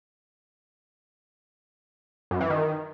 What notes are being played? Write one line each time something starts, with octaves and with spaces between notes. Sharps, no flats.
F#2
E3
D#3